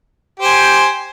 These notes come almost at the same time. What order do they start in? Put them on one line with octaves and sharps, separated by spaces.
G4 C5 G#5